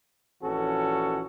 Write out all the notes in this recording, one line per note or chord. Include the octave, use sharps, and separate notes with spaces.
A#1 E3 C#4 F#4 A4